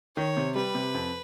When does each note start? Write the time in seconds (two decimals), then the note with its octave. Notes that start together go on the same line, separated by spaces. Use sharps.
0.17 D#3 C#5
0.37 C3
0.55 G3 B4
0.75 C3
0.94 F2